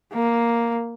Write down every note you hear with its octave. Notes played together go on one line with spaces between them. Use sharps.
A#3